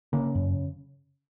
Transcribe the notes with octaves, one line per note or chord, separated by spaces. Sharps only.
C#3 A#3
F#2